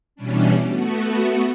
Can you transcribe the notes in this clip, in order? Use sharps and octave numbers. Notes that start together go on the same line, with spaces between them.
B2 E3 G3 C#4 D4
A3 B3 F#4